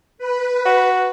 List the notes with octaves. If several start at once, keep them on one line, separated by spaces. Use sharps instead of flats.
B4
F#4